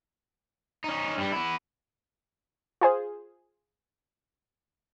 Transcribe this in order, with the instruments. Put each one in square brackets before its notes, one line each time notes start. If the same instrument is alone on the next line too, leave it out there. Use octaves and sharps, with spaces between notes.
[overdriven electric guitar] C#4 D#4
G2 G3
B3 E4
[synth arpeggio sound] F4 G#4 C5